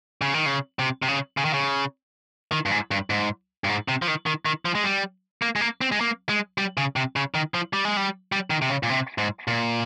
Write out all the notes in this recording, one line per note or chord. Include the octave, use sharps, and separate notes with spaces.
C#3
D#3
C#3
C3
C3
C#3
C#3
D#3
C#3
D#3
G2
G#2
G2
G#2
G2
G#2
C3
F3
D#3
D#3
D#3
F3
G#3
G3
A#3
G#3
A#3
C4
G#3
A#3
G#3
G3
C#3
C3
C#3
D#3
F3
G3
G#3
G3
G3
D#3
C3
C#3
A#2
C3
G#2
A#2